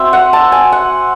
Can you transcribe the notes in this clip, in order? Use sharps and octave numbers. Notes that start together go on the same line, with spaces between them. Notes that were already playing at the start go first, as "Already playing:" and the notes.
Already playing: C4 F#4 C5 E5
F#5
A5
G#5
F#5